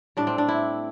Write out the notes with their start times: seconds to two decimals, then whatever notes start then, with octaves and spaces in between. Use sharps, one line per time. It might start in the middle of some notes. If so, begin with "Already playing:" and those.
0.17 A2 G3 D4
0.27 C4
0.38 D4
0.48 E4